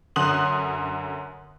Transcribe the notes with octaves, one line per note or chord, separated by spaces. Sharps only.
F#2 D3 C6 D#6 F#6 F#7